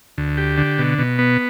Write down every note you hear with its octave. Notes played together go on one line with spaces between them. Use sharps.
D2
G4
D3
B2
B2
B3